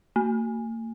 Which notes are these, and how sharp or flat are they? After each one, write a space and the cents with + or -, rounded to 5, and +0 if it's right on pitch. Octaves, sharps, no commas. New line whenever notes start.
A#3 -45